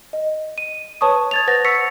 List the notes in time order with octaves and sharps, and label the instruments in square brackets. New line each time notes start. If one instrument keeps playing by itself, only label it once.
[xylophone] D#5
D#7
B4 C#5 A5 C#6 D#6
G#6 A6 F7
B4 C5 F#5 A6 A#6
B4 C#6 E6 B6 C#7